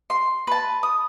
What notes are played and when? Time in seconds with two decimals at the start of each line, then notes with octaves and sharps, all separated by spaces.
0.10 C6
0.47 B4 A5
0.83 D#6